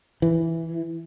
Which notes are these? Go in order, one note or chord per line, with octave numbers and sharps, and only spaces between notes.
E3